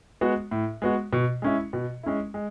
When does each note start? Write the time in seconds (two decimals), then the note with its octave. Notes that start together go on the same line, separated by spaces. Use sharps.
0.21 G#3 B3 F#4
0.51 A2
0.82 G#3 B3 F#4
1.13 B2
1.42 G#3 C#4 E4
1.73 B2
2.03 G#3 C#4 E4
2.34 G#3